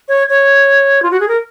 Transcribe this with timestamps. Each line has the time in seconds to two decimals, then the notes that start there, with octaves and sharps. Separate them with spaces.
0.08 C#5
0.29 C#5
1.02 F4
1.11 F#4
1.20 G#4
1.28 A#4